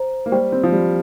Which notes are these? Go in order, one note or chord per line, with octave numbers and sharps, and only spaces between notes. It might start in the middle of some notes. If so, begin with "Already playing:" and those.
Already playing: C5 A#5
A#3
G3 G4 C5 G5
C4
F3
G3